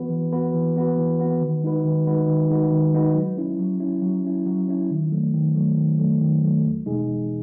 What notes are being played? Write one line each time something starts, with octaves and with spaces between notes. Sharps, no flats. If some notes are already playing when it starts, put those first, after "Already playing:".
Already playing: E3 B3 F#4 B4
E3
B3 F#4 B4
E3
B3 F#4 B4
E3
B3 F#4 B4
D#3
G#3 D#4 F#4 B4
D#3
G#3 D#4 F#4 B4
D#3
G#3 D#4 F#4 B4
D#3
G#3 D#4 F#4 B4
F#3
C#4 E4
F#3
C#4 E4
F#3
C#4 E4
F#3
C#4 E4
D#3
F#3 A3
D#3
F#3 A3
D#3
F#3 A3
D#3
F#3 A3
E2
B2 G#3 D#4 G#4
E2